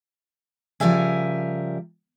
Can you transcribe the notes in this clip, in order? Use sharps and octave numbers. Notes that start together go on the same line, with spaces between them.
C#3 F3 G3 A#4 E5 G#5